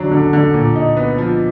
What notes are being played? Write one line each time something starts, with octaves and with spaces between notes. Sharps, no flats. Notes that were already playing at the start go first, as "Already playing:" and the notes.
Already playing: D3 F#3 D4
D3
D3
A#2
D#4
B3
F3